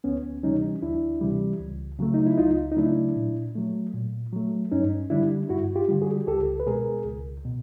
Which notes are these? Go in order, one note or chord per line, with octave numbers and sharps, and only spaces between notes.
D2 B3 C#4
C3 E3 G3 C#4 D#4
D2 D4 E4
C3 E3 G3
C#2
C#3 F#3 A3
D#4
E4
C#2 D#4 F4
D#4
C#3 F#3 A3 D4 E4
A#2
F#3 A3
A#2
F#3 A3
G2 C#4 D#4
D3 G3 D4 E4
G2 E4 F#4
F4 G4
D3 G3
F#4 G#4
C#2 G4 A4
B4
B2 G#3 G#4 A#4
C#2
B2